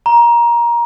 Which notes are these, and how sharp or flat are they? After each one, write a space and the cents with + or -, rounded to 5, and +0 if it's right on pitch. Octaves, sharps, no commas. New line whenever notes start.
A#5 +20